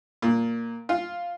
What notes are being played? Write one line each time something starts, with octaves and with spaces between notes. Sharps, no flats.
A#2
F4